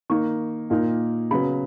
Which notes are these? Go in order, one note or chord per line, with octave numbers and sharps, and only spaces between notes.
D#3 A#3 D#4 C#6
A#2 A#3 D#4
C#3 F#3 B3 B5